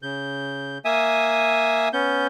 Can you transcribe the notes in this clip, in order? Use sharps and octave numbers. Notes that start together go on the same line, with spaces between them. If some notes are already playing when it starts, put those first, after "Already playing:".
C#3 G6
A#3 E5 G#5 D#6
B3 C#4 G6